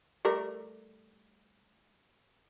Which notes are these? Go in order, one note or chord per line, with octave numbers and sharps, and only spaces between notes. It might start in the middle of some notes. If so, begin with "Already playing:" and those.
G3 A3 A#4